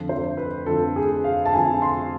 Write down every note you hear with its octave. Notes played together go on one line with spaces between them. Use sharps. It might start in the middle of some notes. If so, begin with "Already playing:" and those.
Already playing: F2 D3 F3
C5
B4
F2 D3 F3 A4
G#4
F5
A5
F2 D3 F3 G#5
C6